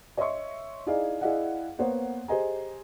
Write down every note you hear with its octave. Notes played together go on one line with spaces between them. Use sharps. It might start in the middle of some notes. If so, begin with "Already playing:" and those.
C#5 D#5 E5 C6 C#6
D#4 E4 G#4 D5 D#5 F5
E4 G#4 D5 D#5 F5 F#5
A#3 B3 C5 C#5 F#5
G4 G#4 C5 D#5 G#5 A#5